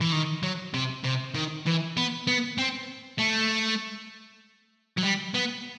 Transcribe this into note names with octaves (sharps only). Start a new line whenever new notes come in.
E3
D#3
F#3
C3
C3
D#3
E3
B3
B3
C4
A3
F#3
G3
B3